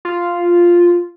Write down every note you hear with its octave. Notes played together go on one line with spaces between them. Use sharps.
F4